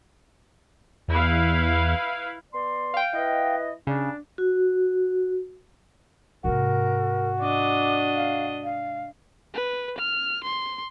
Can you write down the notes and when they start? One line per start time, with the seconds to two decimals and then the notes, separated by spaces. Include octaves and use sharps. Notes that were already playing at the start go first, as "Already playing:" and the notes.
1.08 E2 E4 B4 F5
2.53 B3 D5 C6
2.94 F5 G5
3.13 E4 B4 D#5
3.87 C#3 D4
4.38 F#4
6.44 G#2 C3 F#4 A#4
7.41 D4 D#5 D6
8.16 F5
8.64 F5
9.53 B4
9.98 F6
10.43 C6